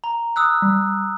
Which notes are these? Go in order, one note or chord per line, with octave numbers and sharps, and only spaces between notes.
A#5
D#6 E6 F#6
G3